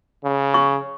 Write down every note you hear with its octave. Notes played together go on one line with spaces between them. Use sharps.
C#3
C#6